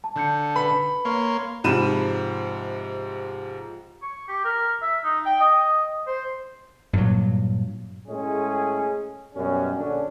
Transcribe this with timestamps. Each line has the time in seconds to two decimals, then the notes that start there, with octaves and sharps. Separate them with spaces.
0.04 A5
0.16 D3 A5 G6 C#7
0.56 B4 B5
1.05 A#3 C#5 C6
1.64 G#2 C3 F3 B5 D#7 E7
4.02 C#6
4.28 G4
4.45 A#4
4.82 E5
5.04 D#4
5.26 G5
5.40 D#5
6.07 C5
6.93 G2 A#2 F#3
8.08 A2 G#3 C#4 G#4
9.35 F#2 B2 G3 C#4
9.78 A#1 D3 C#4 D4